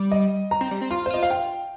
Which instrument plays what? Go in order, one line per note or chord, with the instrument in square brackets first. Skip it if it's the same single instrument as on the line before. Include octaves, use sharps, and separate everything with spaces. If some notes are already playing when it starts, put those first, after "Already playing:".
Already playing: [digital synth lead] G3
[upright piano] D#5
A#5
[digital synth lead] C4
G3
C4
[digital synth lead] F4 [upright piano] C6
[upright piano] C5
[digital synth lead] F4 [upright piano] D#5
[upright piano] F5
G5